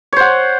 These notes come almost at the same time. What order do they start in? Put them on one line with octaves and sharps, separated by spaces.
C#5 C5 F#5